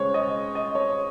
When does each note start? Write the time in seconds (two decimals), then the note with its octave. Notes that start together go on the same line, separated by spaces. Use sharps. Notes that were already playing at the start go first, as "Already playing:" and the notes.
Already playing: C#2 C#3 G#3 C5 C#5
0.14 D#5
0.55 D#5
0.75 C#5